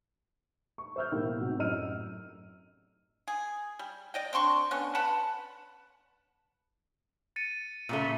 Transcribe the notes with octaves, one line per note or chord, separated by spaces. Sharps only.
C#6
C5 E5 E6 F6 G6
E1 A2 A#3 G4
G#2 C3 F#4 F#5
F#2 A2 D#5 E6 F6 D#7
G#4
G3
D5 D#5 G5
C4 D4 C6 C#6
D3 B3 C#4
B4 F#5 A5 B5
A6 C#7 D#7
A#2 C#3 A3